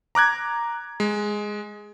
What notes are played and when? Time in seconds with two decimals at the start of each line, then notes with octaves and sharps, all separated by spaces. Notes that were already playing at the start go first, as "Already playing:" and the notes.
0.15 A#5 D6 F#6 G#6
1.00 G#3